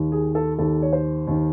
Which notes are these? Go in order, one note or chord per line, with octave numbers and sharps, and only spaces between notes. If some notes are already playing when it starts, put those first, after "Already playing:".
Already playing: D#2 D#3
G#4
A4
D#2 D#3 A4
C#5
C5
D#2 D#3